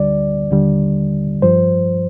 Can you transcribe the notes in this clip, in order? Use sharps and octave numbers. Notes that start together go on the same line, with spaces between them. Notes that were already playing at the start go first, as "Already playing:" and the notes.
Already playing: D2 D3 G3 D5
D#2 D3 G3
G2 F3 C5